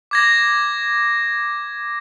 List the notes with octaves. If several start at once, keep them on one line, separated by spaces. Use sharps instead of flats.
D6 G#6 A#6